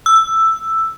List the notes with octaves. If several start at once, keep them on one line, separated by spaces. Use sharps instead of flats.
E6